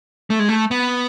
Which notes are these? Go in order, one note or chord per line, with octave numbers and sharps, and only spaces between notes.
A3
G#3
A3
B3